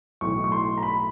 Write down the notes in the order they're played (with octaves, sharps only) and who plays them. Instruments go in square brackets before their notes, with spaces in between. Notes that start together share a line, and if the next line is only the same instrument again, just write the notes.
[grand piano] B1 A2 E3 C#6
C#6
C6
A#5
B5